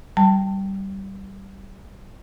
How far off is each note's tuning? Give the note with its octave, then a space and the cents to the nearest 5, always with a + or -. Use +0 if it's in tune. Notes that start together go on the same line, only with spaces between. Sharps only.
G3 -15 A5 +25